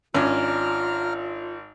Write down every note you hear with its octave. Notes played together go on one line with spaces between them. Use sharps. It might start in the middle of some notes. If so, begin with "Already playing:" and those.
G#1 C#4 D4 F4 A#5 F6